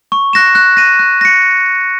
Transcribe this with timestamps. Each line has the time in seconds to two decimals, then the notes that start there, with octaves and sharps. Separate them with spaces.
0.12 C#6
0.33 F#6 A#6 E7
0.55 F#6
0.77 A#6 D#7
0.99 F#6
1.21 A#6 C#7